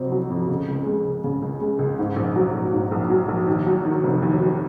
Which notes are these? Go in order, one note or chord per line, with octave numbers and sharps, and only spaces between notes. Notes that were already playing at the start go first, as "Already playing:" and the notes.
Already playing: F2 C3 F#3 C4
F#3
F2
C#3
C#2
G#3
C#2
C#3
C#2
G#3
C#2
G#2
A#1
F#3
A#1
G#2
A#1
F#3
A#1
D#2
F#3
D#3
F1
D#2
F#3